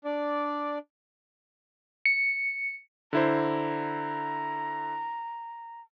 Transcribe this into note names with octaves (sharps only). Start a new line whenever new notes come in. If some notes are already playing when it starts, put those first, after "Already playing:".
D4 D5
C#7
D3 E4 C5 A#5